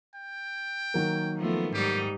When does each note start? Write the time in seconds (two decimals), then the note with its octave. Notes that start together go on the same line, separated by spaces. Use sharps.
0.15 G5
0.94 D#3 F#3 A#3
1.37 F3 A3 B3
1.74 G#2 G3 D#4 G4